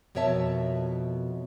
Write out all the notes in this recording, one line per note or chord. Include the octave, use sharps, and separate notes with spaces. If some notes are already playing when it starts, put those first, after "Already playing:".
F2 B2 A#4 C#5 E5 A5